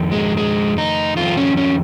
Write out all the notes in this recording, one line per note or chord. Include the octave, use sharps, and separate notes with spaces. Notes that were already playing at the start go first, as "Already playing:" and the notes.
Already playing: F2 D#3
G#3
G#3
D#4
F2 D#3 F4
C#4
C#4